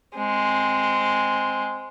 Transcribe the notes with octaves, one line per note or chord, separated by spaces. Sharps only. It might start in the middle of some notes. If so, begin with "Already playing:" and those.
G#3 C4